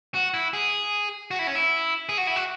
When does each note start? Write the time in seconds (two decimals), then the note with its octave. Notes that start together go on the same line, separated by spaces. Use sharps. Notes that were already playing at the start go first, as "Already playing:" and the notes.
0.14 F#4
0.34 E4
0.53 G#4
1.31 F#4
1.39 E4
1.47 C#4
1.55 E4
2.09 G#4
2.18 F#4
2.27 E4
2.36 F#4